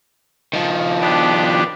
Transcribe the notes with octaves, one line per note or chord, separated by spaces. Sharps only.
D#3 F3
B3 D4 G4